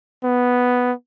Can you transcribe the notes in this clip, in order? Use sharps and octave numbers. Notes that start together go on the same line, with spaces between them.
B3